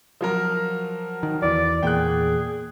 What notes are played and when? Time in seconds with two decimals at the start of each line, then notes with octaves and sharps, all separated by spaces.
0.21 F3 F#3 A#4
1.23 D#3
1.42 E2 E3 D5
1.83 E2 A#2 G#4 G5 F#6